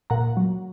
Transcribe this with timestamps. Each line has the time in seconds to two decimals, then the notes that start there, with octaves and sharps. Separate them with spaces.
0.10 A#2 F#5 A#5
0.37 F#3